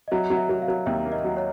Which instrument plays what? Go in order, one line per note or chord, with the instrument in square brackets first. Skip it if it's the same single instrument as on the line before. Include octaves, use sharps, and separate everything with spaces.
[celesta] D#5
[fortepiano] F#3 [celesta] E5
[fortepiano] F#3
[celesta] E5
[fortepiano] F#3
[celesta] F5
[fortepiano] F#3
[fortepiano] D#2 [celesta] E5
[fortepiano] A#3
[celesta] D#5
[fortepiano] F#3
[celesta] C#5